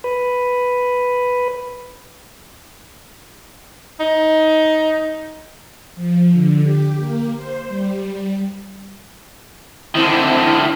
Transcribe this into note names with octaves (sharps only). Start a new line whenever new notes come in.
B4
D#4
F3
D3
G4
A#3
C5
G3
D3 D#3 C4 E4